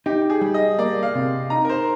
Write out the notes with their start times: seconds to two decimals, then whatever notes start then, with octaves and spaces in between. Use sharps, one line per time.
0.06 D#4 G4
0.30 G#4
0.41 G3
0.54 D#5
0.79 A#3 D5
1.03 F5
1.15 C3
1.50 D#4 A#5
1.65 A#4
1.69 C5